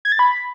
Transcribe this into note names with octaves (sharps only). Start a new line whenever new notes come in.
G#6
A6
B5